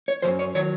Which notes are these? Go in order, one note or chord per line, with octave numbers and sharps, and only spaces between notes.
C#5
F#2 D#3 F#3 C5
C#5
D#3 F#3 C#5